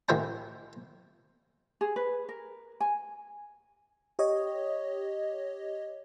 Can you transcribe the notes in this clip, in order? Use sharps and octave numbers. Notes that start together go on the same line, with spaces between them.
A1 D#3 C5 E5 G5 A#5
G#4
B4
A#4
G#5
G4 C#5 D#5